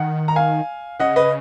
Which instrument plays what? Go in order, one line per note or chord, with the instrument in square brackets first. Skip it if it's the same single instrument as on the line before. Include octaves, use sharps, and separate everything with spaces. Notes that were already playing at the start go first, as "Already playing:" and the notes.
Already playing: [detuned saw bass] D#3 [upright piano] F#5
[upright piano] A#5
F5 G#5
[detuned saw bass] C#3 [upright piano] D#5 F#5
[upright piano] B4 D#5